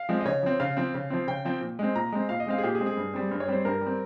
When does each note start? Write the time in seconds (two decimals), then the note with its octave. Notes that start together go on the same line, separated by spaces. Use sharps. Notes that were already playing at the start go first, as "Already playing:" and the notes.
Already playing: F5
0.09 F3 G#3 C4
0.21 D#5
0.25 C#3 C#5
0.43 F3 C4
0.60 C#3 F5
0.77 F3 C4
0.94 C#3
1.10 F3 C4
1.27 C#3 G5
1.45 F3 C4
1.61 A#2
1.79 G#3 C4
1.95 A#2 A#5
2.12 G#3 C4
2.29 A#2 F5
2.40 D#5
2.46 G#3 C4 F5
2.58 G#4
2.63 A#2 G4
2.75 G#4
2.80 G#3 C4
2.86 G#4
2.97 G2
3.14 G3 C4
3.31 G2
3.40 C#5
3.48 G3 C4 C5
3.65 G2 A#4
3.81 G3 C4